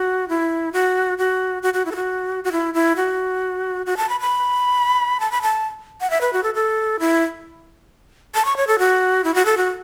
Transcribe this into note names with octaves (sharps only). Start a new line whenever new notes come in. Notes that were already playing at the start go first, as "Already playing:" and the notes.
Already playing: F#4
E4
F#4
F#4
F#4
F#4
E4
A4
F#4
F#4
E4
E4
F#4
F#4
A5
B5
B5
A5
B5
A5
F#5
E5
B4
F#4
A4
A4
E4
A5
C#6
C#5
A4
F#4
E4
F#4
A4
F#4